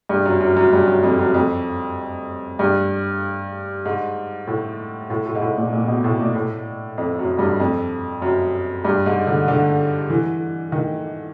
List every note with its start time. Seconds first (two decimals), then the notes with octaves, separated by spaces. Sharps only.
0.09 G2
0.25 F#2
0.41 F#2
0.56 F#2
0.73 G2
0.87 F#2
1.03 F2
1.19 F#2
1.34 F2
2.59 G2
3.85 G#2
4.47 A2
5.10 A2
5.26 A2
5.35 G#2
5.42 A2
5.57 A#2
5.73 A#2
5.88 B2
6.04 A2
6.20 A#2
6.35 A2
6.98 F2
7.19 F#2
7.39 G2
7.60 F2
8.22 F#2
8.85 G2
9.06 G#2
9.26 D3
9.48 D3
10.10 E3
10.72 D#3